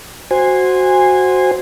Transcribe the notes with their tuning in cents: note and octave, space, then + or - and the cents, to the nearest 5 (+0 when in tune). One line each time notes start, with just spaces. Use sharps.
F#4 +0 C5 +0 G#5 -20